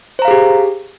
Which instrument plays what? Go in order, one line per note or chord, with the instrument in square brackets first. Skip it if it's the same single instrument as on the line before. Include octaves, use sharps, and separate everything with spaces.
[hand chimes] C5
A#5
F5
G#4
G4